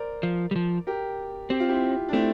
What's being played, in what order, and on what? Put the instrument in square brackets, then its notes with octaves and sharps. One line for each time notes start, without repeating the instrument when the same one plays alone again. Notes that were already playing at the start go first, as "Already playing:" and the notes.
Already playing: [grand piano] A#4 C5 D5
[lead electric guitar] F3
G3
F3
[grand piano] G4 A#4
[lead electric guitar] C4 [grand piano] G4
[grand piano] F4
E4 G4
D4
[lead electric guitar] A3 [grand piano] C4 E4